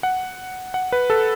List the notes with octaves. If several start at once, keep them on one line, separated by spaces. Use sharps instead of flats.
F#5
F#5
B4
A4